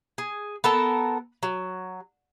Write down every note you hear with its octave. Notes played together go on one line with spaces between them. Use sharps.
G#4
B3 A4 A#4 A5
F#3